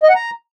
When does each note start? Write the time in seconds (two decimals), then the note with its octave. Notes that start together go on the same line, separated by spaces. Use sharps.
0.03 D#5
0.09 F#5
0.15 A#5